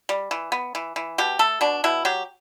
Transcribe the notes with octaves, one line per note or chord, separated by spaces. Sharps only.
G3
E3
B3
E3
E3
B2 G4
A3 A4
B2 D4
B2 E4
F#3 G4